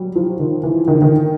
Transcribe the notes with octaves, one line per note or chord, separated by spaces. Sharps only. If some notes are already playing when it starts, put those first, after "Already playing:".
Already playing: F#3 G3
F3
D#3
E3
D#3
D3
D#3